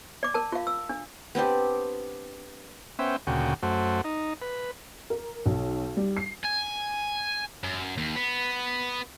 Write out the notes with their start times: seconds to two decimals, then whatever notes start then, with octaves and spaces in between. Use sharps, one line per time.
0.23 D5 D6
0.34 A#4 A5
0.52 F4 F5
0.67 E6
0.89 D4
1.35 B3 C4 D4 G4
2.99 B3 C#4 C5 E5 G5
3.27 D2 A#2 C#3 F#4 G5
3.63 F#2 A3 F#4 C5
4.04 D#4
4.42 B4
5.10 A#4
5.46 B1
5.97 G3
6.17 C7
6.45 G#5
7.64 F#2
7.98 D#2
8.16 B3